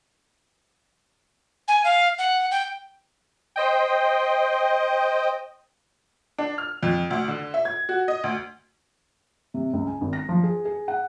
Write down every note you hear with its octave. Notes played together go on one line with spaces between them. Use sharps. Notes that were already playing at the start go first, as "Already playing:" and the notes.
G#5
F5
F#5
G5
C5 D#5 G5
D4
F6
F2
D2
D3
E5
G#6
F#4
D#5
D2
C3
C#2
G#5
G#1
A#6
F3
G#4
G#4
F#5